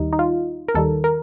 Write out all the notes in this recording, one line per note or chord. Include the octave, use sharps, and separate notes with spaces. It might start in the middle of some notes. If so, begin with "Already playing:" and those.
Already playing: D#2 D#3 G3 D#4
D#4
F4
A#4
D#2 D#3 G3 A4
A#4